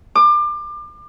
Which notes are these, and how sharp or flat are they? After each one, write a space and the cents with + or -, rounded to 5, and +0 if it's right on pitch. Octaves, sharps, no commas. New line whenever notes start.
D6 +30